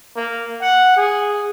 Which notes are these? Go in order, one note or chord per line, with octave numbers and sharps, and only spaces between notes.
A#3
F#5
G#4